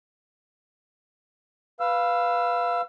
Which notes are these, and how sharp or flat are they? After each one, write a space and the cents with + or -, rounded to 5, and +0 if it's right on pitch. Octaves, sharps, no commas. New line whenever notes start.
B4 +0 F5 +0 E6 +20